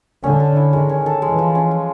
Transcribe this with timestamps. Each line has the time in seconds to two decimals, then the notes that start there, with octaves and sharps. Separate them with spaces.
0.23 D3 C#4
0.40 A4
0.56 E4
0.72 D#3 G#3
0.89 C#4
1.06 A4
1.22 E3 G#3
1.39 F3
1.55 C#4
1.71 F3